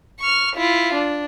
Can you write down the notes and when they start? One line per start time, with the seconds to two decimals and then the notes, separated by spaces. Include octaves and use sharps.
0.20 C#6 F6
0.55 E4 F4
0.94 D4